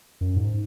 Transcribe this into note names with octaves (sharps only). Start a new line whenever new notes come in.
F#2
G#2